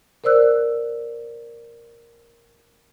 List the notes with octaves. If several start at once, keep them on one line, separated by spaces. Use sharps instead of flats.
A#4 C5 D5 E6 F#6